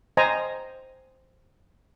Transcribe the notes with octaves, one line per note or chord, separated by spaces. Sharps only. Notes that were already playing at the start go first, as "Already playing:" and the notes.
C5 D#5 G#5 A#5